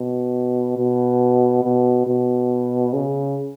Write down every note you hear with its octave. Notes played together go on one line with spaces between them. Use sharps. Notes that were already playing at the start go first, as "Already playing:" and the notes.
Already playing: B2
B2
B2
B2
C#3